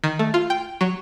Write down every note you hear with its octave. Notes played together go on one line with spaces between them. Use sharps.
D#3
A3
F4
G5
F#3